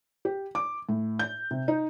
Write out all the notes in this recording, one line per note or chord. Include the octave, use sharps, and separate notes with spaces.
G4
D6
A2
G6
C3
D#4